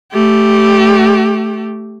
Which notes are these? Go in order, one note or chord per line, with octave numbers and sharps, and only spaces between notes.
A3 G4